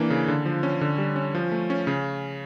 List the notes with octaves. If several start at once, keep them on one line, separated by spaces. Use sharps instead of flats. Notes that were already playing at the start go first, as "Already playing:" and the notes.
Already playing: E3 A#3 D4
C#3
D3
F3
C#4
D3
G3
C#4
F3
A3
C#4
C#3